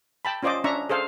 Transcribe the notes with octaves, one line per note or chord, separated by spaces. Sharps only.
G5 A5 B5
C#4 F4 C5 D5 D#5 D6
C#4 D4 E5 A#5 C#6
G#4 A4 C5 F5